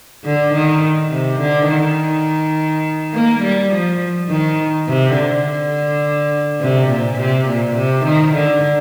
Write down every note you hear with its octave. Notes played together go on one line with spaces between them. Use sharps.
D3
D#3
C3
D3
D#3
A#3
G3
F3
D#3
C3
D3
C3
A#2
C3
A#2
C3
D#3
D3